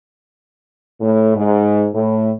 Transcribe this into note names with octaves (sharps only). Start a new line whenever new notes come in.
A2
G#2
A2